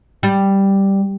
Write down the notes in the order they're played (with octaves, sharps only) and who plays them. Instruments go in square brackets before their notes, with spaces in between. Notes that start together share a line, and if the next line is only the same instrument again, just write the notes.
[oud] G3